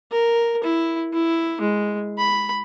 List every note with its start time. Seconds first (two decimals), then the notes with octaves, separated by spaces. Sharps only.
0.12 A#4
0.64 E4
1.13 E4
1.61 G#3
2.18 B5